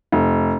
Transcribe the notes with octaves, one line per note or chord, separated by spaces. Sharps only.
F1